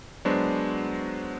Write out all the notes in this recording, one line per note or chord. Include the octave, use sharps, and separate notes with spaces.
F#3 G#3 B3 D4 F#4 C5